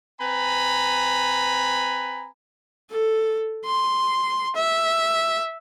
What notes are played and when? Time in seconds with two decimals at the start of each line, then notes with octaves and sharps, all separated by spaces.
0.21 C4 B4 G#5 A#5 B5
2.91 A4
3.65 C6
4.56 E5